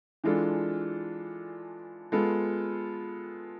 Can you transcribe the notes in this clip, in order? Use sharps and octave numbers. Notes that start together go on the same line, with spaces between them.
E3 G#3 D4 F4 A4
G#3 B3 F4 A4